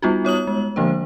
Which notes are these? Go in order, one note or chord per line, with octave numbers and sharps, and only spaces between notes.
G3 B3 D#4 F4 F#4
B3 C#5 D#6 F#7
G#3
D3 F3 A#3 D4 C5